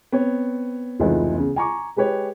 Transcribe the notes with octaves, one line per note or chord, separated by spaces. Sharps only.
B3 C4 C#5
F1 C#2 E3 D#4 F4 B4
E2 C#3
G#5 A#5 C#6 D6
G#3 G4 B4 C#5